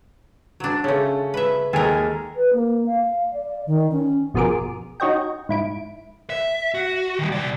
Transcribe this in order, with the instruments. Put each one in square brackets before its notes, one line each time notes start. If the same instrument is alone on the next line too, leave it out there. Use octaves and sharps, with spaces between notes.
[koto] F#3 D4
[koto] C#3 A3 [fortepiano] C#4
[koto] B4 E5
[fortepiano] D#2 G#3 G#5 [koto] A4 A#4
[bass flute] B4
A#3
F5
D5
D#3
C#4
[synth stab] G1 B2 F3 G#4 A#4 D6
D#4 F#4 C#5 D#5 G5
G#2 E4 D7
[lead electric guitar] E5
F#4
D#3 G3
C3 D5